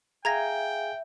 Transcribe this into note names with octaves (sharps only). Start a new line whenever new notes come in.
G#4 E5 F5 G5 G#5 A#5 G#6 A#6